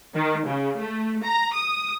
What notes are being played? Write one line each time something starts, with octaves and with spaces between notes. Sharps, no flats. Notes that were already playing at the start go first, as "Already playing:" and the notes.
D#3
C#3
A3
A#5
D#6